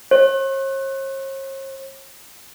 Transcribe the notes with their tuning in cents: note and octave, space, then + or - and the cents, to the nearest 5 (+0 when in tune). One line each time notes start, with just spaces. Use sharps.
C#5 -45